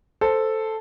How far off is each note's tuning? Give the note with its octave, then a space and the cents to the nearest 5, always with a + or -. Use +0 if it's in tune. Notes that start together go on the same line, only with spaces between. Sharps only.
A4 +0 C5 +0